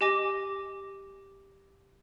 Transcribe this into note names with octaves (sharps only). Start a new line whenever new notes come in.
G4 D#5 G#5 D6 A#6